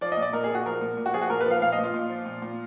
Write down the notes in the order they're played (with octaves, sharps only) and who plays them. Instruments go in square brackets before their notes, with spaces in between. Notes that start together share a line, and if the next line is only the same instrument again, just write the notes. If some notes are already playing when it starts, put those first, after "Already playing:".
[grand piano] F3 D5
D#5
A#2
D5
A#2 A#4
G#4
A#2
F#4
F3 A#4
A#2
A#2
F#4
F3 G#4
F#4
A#2 A#4
B4
F3 F5
A#2 F5
D#5
A#2
F4
A#2
F3
A#2
A#2